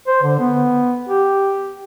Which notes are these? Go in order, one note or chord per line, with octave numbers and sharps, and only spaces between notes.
C5
D3
B3
G4